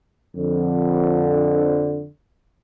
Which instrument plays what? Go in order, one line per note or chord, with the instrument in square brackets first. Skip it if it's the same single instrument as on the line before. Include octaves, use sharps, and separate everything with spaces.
[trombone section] F2 D3